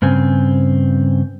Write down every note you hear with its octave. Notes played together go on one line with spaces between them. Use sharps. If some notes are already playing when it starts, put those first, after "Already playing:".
G2 C#3 C4 G#5